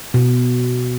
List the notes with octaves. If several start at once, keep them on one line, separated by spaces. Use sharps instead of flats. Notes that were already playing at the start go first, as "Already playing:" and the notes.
B2